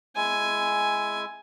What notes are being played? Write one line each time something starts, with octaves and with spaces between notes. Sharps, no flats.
G#3 E4 G#5